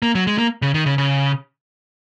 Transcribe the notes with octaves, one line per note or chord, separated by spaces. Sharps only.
A#3
F#3
G#3
A#3
C#3
D#3
C#3
C#3